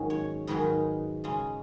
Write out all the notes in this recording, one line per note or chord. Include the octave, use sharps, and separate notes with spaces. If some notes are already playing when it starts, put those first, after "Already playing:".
Already playing: G#2 D#3 F#3 C#4
C#5
G#2 D#3 F#3 C#4 B4
C#3 G#3 C#4